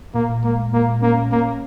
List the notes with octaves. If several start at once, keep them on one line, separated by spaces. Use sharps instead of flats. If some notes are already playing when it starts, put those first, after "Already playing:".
A#2 A#3
G#3 A#3
A#2 A#3
A#3 C#4
A#3 C#4